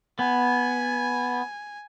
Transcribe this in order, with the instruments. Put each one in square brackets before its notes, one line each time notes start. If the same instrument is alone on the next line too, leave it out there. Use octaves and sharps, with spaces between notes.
[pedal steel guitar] B3 [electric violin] G#5